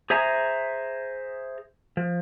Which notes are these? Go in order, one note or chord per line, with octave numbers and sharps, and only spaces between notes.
G#4 C5 E5 G#5 A#5
F3